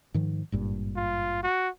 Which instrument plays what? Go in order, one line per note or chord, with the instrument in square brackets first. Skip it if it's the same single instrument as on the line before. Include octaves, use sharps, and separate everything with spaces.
[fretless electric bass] G#2 D#3 F3
G#1 G2 A#2
[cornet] F4
F#4